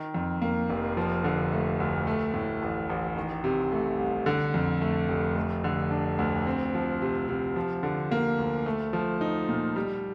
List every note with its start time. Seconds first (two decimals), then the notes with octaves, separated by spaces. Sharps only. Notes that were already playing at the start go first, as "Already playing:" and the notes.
Already playing: D#3
0.14 F2
0.42 A#3
0.70 F1
0.97 F3
1.24 D3
1.52 A3
1.80 D2
2.07 A3
2.34 A2
2.62 A1
2.89 A1
3.16 D#3
3.44 C3
3.72 A3
3.99 C2
4.26 D3
4.54 F2
4.82 A3
5.08 F1
5.36 A3
5.64 D3
5.91 D4
6.18 D2
6.47 C4
6.74 F3
7.02 C3
7.29 C3
7.56 F3
7.83 D3
8.11 A#3
8.38 D2
8.66 A3
8.93 F3
9.21 D#4
9.49 A#2
9.76 G3